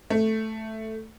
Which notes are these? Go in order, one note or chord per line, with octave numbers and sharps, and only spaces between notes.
A3